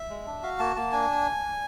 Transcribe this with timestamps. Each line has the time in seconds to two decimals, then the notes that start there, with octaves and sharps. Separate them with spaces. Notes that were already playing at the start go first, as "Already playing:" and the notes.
Already playing: E5
0.10 G#3
0.26 D4
0.43 F#4 F5
0.59 A#3 A5
0.76 A#3 A5
0.92 D4 G#5